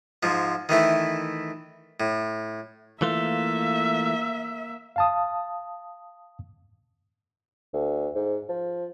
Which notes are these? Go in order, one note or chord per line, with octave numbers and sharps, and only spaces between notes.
G#2 F3
D#3 E3 A3 E4
A2
E3 A3 A#3 F4 E5
F5 A5 D#6
D2
G#2
F3